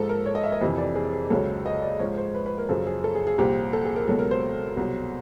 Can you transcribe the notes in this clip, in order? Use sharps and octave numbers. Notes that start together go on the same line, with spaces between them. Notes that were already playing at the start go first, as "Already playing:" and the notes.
Already playing: G#2 F3 A4
A#4
C#5
D#5
E5
D#5
F2 C3 E3
D5
G#4
G#4
C#2 C#3 F#3 A4
D#5
D5
G#2 F3 C#5
C5
B4
B4
A#4
F#2 C#3 F3 A4
G#4
A4
G#4
G#4
C2 A#2 F3 G4
A4
G#4
A#4
C#2 B2 F#3 A4
A#4
C5
C2 B2 F#3